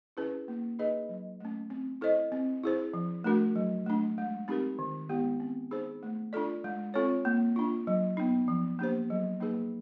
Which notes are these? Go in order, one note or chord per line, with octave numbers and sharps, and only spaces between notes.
C#4 E4 G#4 B4
A#3
D#4 G#4 B4 D#5
F#3
A3 C#4
C4
E4 A4 C5 D#5
C4
E4 G#4 C5
F3
A3 D4 F#4 A#4
F#3
A3 D4
G#3
C4 D#4 G4 A#4
D#3
G#3 B3 E4 G4
C4
D#4 G#4 C5
A3
D4 F4 A4 D5
G#3
C4 F4 A4 C#5
A#3
D4 F4
F#3
B3 D#4
F3
A#3 D4 G4 C5
F#3
A#3 D#4 G#4 B4